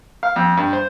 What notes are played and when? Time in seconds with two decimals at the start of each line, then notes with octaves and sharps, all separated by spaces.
0.23 F5
0.36 F2
0.57 G2
0.73 C5